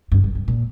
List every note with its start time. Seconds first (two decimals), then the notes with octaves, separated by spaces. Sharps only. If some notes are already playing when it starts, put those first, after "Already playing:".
0.12 G2
0.24 G2
0.35 G2
0.48 A#2